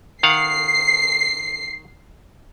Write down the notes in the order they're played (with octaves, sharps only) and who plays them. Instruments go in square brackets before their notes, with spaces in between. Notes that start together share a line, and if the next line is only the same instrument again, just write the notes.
[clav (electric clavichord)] D#3 F5 F#5 [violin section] C7